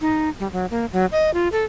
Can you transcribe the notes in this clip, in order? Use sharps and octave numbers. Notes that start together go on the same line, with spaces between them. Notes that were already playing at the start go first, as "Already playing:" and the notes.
D#4
G3
F#3
A#3
F#3
D#5
F4
A4